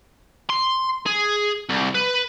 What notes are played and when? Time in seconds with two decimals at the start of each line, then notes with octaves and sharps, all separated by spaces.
0.49 C6
1.06 G#4
1.69 C2
1.94 B4